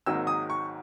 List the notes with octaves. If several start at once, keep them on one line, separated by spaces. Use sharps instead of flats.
G#1 G#2 F#3 A#3 D#4 E6
D#6
C#6